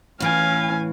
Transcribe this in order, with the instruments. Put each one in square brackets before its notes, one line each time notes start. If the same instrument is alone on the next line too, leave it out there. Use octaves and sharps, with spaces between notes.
[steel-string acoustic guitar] A2 E3 [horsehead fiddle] C#4 G#5 [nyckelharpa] F5